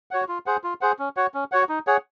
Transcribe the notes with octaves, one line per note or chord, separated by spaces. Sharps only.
F#4 C#5 F#5
F4
G#4 C5 F#5
F4
G#4 C5 F#5
C#4
F#4 C#5 F#5
C#4
F#4 C#5 F#5
D#4
G#4 C#5 F#5